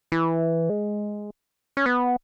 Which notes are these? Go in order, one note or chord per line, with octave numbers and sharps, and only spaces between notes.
E3
G#3
C#4
B3